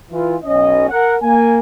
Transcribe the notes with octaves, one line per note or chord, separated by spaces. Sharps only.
E3 F4
B1 C#4 D#5
A#4 F#5
A#3 G#5